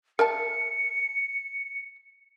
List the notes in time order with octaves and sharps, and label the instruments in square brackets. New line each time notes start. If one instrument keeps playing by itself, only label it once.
[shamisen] A#4 E5 A5 [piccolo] C#7